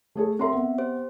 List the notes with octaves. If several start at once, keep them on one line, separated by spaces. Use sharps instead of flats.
A3 G#4 A4
C4 A4 A#4 E5 C6
B3
G4 C5